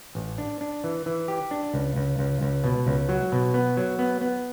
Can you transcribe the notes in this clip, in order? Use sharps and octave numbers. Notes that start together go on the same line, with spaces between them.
A1
D4
D4
E3
E3
G4
D4
C#2
C#2
C#2
C#2
B2
C#2
F#3
B2
B3
F#3
B3
B3